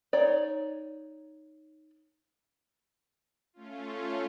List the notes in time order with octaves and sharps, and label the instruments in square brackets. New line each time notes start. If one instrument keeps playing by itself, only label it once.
[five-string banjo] D#4 C#5 D5
[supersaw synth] A3 C#4 F4